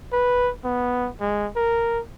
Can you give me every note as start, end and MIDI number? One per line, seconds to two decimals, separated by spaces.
0.12 0.50 71
0.64 1.10 59
1.20 1.47 56
1.56 2.00 70